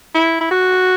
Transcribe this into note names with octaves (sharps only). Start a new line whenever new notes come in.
E4
E4
F#4